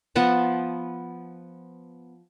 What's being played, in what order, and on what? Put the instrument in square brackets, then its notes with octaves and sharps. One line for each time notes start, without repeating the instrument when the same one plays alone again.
[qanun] F3 B3 F#5 A5